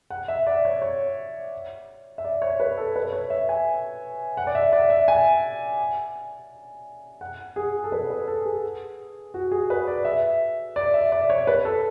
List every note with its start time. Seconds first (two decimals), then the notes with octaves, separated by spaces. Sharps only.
0.10 F#5
0.28 E5
0.47 D5
0.65 C#5
0.82 C#5
2.18 E5
2.24 D5
2.42 C#5
2.60 B4
2.78 A4
2.96 B4
3.13 C#5
3.30 E5
3.49 G#5
4.37 F#5
4.47 D5
4.55 E5
4.73 D5
4.90 E5
5.08 G#5
7.21 F#5
7.56 G#4
7.84 A4
7.92 B4
8.10 B4
8.28 A4
8.45 G#4
9.34 F#4
9.52 G#4
9.70 B4
9.87 D5
10.05 E5
10.76 D5
10.94 E5
11.12 D5
11.30 C#5
11.47 B4
11.65 A4